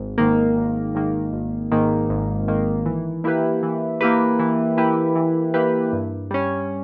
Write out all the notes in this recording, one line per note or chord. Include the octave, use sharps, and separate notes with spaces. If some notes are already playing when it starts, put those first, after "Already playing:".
Already playing: G#1
G#2 D#3 A#3
G#1
G#2 D#3 A#3
G#1
G#2 D#3 A#3
G#1
G#2 D#3 A#3
E3
A#3 E4 G4 B4
E3
A#3 E4 G4 B4
E3
A#3 E4 G4 B4
E3
A#3 E4 G4 B4
G2
G3 C#4